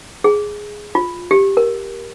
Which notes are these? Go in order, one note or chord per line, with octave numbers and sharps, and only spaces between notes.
G#4
F4
G4
A#4